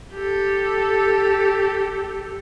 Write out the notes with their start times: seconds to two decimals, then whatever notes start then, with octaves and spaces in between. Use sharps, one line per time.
0.14 G4 A4